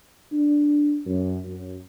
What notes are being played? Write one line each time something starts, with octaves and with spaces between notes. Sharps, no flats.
D4
F#2
F#2